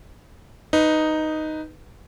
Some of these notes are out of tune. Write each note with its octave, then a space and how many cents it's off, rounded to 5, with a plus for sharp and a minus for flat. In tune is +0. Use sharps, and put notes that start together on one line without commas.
D#4 +0 B4 +5